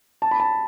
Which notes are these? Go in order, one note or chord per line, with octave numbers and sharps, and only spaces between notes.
A5
B5
A5